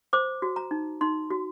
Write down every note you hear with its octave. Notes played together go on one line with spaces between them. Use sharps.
C5 D6
F#4
A#5
D#4
D#4 C6
F#4